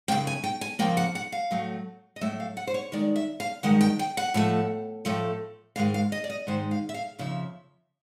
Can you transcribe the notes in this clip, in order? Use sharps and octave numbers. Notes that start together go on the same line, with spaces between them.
F#2 C#3 F3 A#3 G5
G#5
G5
G#5
F#2 C#3 F3 A#3 G5
F#5
F#5
F5
A2 F#3 A3
D#5
A2 F#3 A3 E5
F5
F#5
C5
C#5
G2 D#3 G#3 D5
E5
F5
G2 D#3 G#3 F#5
G5
G5
F#5
A2 F3 A3
A2 F3 A3
G#2 D#3 G#3 F5
F5
D#5
D5
D#5
G#2 D#3 G#3 C5
F5
E5
F5
F2 C#3 F3 E5